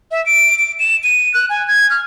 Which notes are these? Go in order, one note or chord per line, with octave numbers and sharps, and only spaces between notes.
E5
D7
D7
E7
D#7
F#6
G#5
G#6
F6